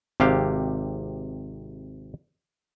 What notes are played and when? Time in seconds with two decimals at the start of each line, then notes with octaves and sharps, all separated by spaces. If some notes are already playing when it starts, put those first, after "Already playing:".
0.20 G#1 C3 G4 F5